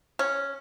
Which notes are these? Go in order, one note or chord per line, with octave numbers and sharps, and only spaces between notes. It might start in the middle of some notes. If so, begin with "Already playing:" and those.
C#4